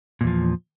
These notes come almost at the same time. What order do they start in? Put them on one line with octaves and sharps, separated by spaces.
A#2 E2 F3